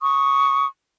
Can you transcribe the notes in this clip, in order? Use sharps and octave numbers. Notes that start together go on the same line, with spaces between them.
C#6 D#6